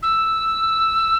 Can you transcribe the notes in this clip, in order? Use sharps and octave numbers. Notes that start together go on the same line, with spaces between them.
E6